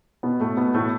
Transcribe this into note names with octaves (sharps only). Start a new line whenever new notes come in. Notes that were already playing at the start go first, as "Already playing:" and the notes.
B2 B3
A2 A3
B2 B3
A2 A3